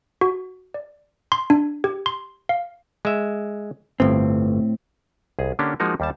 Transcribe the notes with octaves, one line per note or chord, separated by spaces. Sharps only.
F#4
D5
C6
D4
G4
C6
F5
G#3 E5
G1 A2 C4
C2 G#4
D3 A#3 C#4 D4 G4
F3 G#3 A#3 D#4 F#4 A#4
D#2 G3 A5